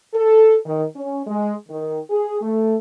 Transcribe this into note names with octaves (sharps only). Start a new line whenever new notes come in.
A4
D#3
C#4
G#3
D#3
G#4
A3